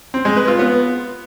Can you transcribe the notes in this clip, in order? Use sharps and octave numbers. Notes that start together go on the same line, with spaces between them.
C4
G#3
B4
F4
B3